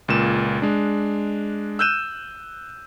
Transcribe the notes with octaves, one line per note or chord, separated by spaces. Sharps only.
C#2 A#2 E7
G#3 D4
E6 F#6 G6 D#7 E7